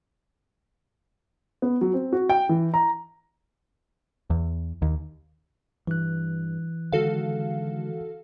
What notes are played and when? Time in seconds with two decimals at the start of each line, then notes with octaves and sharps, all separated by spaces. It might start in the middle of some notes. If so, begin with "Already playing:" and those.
1.62 B3
1.81 F#3
1.94 C4
2.13 F#4
2.29 G5
2.49 E3
2.74 A#5
4.30 E2
4.82 D#2
5.87 G2 E3 F#6
6.92 D3 D#3 G#3 F#4 A4 F5